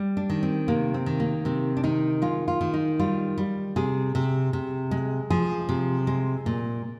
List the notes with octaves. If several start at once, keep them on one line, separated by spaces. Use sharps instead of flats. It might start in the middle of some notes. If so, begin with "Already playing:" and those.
Already playing: G3
D4
D#3
C4
C3 A#3
C4
D#3
A#3
C3 C4
D4
D#3 D#4
G#3 F4
F4
D#3
D#4
G3 F4
G3
C3 G#4
C3
C3
G#3
F3 G#4
C3
G#3
A#2